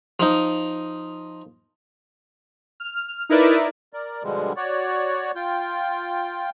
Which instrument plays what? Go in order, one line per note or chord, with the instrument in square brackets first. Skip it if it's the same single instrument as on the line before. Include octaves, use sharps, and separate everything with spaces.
[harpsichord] F3 D#4
[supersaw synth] F6
D#4 E4 A#4 B4 D5 E5
[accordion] A#4 D5
B2 D3 F3 G3 G#3
F#4 C#5 D5
F4 G5